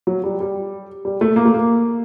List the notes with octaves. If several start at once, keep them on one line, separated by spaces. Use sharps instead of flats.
F#3
G3
G3
G3
A3
A#3
A3
A#3